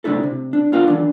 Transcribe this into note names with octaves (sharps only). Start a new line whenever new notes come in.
C3 A3 D4 E4 A4
C3
D4
B3 D4 F4 A#4 F5 F#5
E3 D4